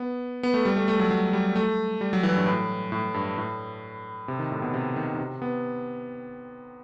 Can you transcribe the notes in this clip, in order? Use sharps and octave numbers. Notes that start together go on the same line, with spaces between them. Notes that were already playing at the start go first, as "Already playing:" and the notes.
Already playing: B3
B3
A3
G3
A3
A3
F#3
F#3
G3
A3
G3
F#3
E3
G2
A2
A2
G2
A2
C3
D#3
A2
B2
C3
D#3
D#3
C3
B3